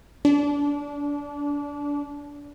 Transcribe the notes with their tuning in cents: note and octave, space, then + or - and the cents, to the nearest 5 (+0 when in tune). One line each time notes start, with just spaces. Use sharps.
D4 -25